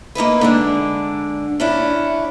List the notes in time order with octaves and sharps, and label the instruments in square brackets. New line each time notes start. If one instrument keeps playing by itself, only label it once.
[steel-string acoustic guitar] A#3 D#4 E4 B4
D3 G#3 D4
C#4 D4 E4